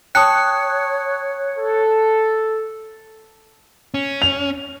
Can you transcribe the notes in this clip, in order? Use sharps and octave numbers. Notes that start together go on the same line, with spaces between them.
C#5 G5 A5 D#6 F#6 C#7
A4
C#4
F7